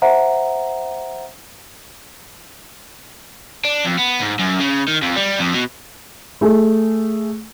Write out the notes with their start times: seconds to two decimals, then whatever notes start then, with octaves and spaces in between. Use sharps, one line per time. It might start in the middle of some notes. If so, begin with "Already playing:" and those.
0.02 C5 E5 F#5 A#5
3.65 D4
3.84 F2
3.98 B3
4.20 G#2
4.39 F#2
4.60 C#3
4.88 D#3
5.03 F2
5.16 G3
5.39 F2
5.54 B2
6.41 A3 G#4